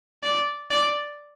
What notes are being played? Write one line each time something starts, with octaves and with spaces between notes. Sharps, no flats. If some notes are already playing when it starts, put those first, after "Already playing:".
D5
D5